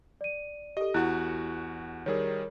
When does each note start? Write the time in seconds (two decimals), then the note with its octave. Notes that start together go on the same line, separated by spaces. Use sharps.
0.21 D5 D#7
0.77 G4 A4 D#5
0.94 E2 E4 F#4 F#5 F#6
2.06 D#3 G3 G#4 A#4 C#5